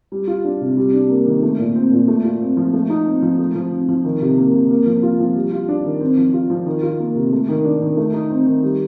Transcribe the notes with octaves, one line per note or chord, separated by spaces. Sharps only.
G3
F4
D4
C3
G3
D4
A#3
D#3
A3
A#2
C4
A#2
A3
F4
C4
F3
A3
D#4
C4
F3
A3
F3
C4
F3
D#3
C3
A#3
C3
A#3
F3
F4
F3
G3
F4
D4
D#3
C4
F3
F4
F3
D#3
F4
A#3
C3
A3
D#3
D4
D#3
A3
D#4
C4
D#3
G3